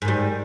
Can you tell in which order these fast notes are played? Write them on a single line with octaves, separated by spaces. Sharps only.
G#2 D#3 G3